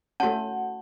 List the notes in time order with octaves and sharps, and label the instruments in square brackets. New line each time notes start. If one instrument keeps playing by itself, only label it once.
[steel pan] A3 C#4 [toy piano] F#4 A5 [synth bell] F#5